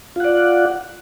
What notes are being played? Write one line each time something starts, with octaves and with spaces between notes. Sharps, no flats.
F4 D5 F#5